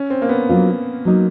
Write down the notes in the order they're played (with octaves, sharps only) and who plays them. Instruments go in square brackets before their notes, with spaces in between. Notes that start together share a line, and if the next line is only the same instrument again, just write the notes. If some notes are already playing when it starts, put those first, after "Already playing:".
Already playing: [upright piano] C#4
C4
A#3
B3
[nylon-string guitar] F#3 A#3 D4 F4
F#3 A#3 D#4